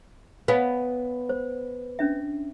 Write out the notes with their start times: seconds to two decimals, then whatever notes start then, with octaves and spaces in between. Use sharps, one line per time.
0.48 B3 C#5 F5 G#5
1.29 C5
1.99 C#4 D4 E5